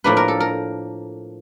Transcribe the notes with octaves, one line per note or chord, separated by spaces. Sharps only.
A2 F3 A#3 D4 B4
A#4
A4
A#4